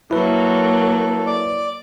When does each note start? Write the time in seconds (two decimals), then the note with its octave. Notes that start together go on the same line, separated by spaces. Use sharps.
0.11 F#3 A#3 E4 A4 B4
1.27 D5 D6